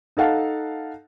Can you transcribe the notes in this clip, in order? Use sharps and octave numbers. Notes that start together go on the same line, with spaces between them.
D#4 A4 F5 F#5 A5